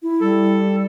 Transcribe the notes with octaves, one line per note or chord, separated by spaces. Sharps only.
E4
G3 A4